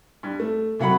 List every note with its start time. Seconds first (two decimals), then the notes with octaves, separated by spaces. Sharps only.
0.23 G2
0.40 A3
0.80 C2 F#3 F#5 B5